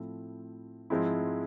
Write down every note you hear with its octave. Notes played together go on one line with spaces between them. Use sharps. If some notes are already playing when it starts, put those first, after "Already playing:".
Already playing: A2 F3 A3 C4 E4
G#2 F3 G#3 C4 E4